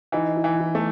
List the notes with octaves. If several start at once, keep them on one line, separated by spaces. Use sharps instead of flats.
E3 D#4
E4
E3
E4
A3